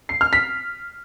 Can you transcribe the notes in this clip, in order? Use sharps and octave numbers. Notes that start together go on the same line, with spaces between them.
C7
F6
B6